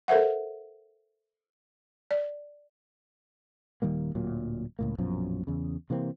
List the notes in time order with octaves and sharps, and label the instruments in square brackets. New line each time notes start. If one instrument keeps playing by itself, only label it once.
[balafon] A4 A#4 C5 E5 F#5
D5
[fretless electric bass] D#1 D#3 G3 A#3
D1 A#2 F#3
C#2 A2 A#3
A#1 F#2 B2 F3
E2 C#3
C3 E3 A#3 C4